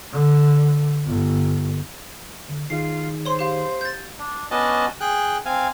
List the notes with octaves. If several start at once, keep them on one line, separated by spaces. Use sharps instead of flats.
D3
G1
D3
D#3 D#4 F4 G#4 C7
C5 C#5 C6
G4 F5
G6 A6
D4
B3 C#4 D4 F#4 D#5 A5
G#4 G5 F#6
C4 F5 G#5